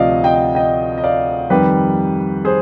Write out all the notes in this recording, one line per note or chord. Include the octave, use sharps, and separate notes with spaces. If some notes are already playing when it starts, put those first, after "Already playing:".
Already playing: D2 C3 F3 D5 D#5 F5
D#5 G5
D#5 G5
D#5
D5 F5
F2 D#3 G3 G4 B4
G#4 C5